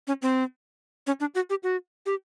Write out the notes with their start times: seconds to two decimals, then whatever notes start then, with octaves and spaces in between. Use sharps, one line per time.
0.07 C#4
0.22 C4
1.07 C#4
1.20 D4
1.35 F#4
1.50 G4
1.63 F#4
2.06 G4